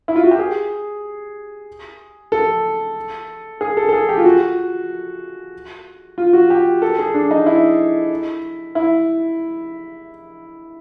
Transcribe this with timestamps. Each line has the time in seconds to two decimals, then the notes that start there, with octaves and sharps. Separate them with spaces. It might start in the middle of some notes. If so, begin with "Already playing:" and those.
0.08 E4
0.16 F4
0.23 F#4
0.31 G4
0.39 G#4
2.32 A4
3.61 G#4
3.77 A4
3.89 A4
3.93 G#4
4.09 G4
4.17 F4
4.24 F#4
6.18 F4
6.33 F#4
6.50 G4
6.82 A4
6.99 G#4
7.14 D4
7.31 D#4
7.46 E4
8.75 E4